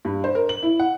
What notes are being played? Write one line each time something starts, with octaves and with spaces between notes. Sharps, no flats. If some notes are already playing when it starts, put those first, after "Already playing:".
G2
C5
A#4
F#7
E4
F#5